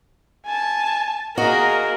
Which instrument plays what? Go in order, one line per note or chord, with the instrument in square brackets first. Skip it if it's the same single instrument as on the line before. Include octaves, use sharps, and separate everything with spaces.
[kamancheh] G#5 A5
[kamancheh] A#3 G#4 [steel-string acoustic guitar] F#4 D#5 [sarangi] A#4